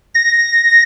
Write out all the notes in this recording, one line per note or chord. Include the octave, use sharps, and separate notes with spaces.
A#6